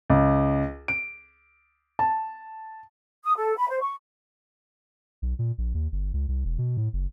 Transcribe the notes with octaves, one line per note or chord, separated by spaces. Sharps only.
C#2
D7
A5
D#6
A4
B5
C5
C#6
B1
A#2
A#1
D#2
G1
C#2
C2
E1
B2
A2
F#1